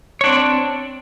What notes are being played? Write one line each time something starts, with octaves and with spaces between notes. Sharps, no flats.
C4 D4 C#5